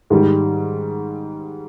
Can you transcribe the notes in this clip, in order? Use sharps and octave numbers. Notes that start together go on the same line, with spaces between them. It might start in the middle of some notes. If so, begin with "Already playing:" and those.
G#2 D#3 G3